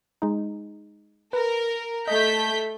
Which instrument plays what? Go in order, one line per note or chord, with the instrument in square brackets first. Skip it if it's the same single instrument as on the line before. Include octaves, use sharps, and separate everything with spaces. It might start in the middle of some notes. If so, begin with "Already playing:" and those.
[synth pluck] G#3 D#4
[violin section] A#4 [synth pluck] B4
[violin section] A3 G6 B6 [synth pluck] D#5